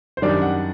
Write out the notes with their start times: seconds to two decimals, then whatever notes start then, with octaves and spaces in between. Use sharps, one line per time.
0.17 C5
0.22 F#2 D#3 G3 D4 D5
0.42 F#5